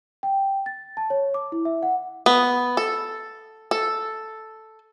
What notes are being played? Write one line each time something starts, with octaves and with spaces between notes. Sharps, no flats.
G5
A6
A5
C#5
D6
E4
E5
F#5
B3
A4
A4